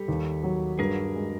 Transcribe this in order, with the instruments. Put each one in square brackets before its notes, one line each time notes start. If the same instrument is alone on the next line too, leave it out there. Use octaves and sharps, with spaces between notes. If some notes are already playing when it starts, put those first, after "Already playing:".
Already playing: [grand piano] G3 [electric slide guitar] G4 A4
[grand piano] D#2
F#3
[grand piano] G2 [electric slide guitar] G#4 A#4
[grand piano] G#3